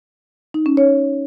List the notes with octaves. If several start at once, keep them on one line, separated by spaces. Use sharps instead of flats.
D#4
C#4
C#5